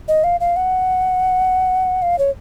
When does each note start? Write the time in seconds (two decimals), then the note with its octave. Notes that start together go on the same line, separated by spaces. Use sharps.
0.08 D#5
0.24 F5
0.40 F5
0.56 F#5
2.02 F5
2.19 C#5